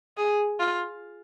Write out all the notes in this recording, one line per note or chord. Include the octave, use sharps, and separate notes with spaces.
G#4
F4